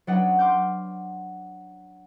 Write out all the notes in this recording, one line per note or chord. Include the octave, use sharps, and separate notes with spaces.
F#3 C#4 D4 B4 D#5 F#5
C6 D6 F6 G6